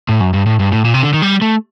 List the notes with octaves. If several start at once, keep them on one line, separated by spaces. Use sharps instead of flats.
A2
F#2
G2
A2
G2
A2
A#2
C3
D3
D#3
G3
A3